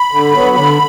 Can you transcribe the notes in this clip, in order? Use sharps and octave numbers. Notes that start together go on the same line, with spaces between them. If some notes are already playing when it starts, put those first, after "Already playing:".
Already playing: B5
D3
F#3 B3
D3